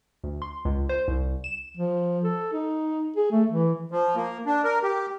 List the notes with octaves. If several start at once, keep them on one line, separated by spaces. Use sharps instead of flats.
D2
C6
C#2
C5
C2
E7
F3
A4
D#4
G#4
A3
E3
F3
A#3
D4
A#4
G4